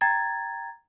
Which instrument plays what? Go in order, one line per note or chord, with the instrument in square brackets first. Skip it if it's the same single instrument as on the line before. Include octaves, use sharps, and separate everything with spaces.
[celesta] G5 A#5 G#6 A6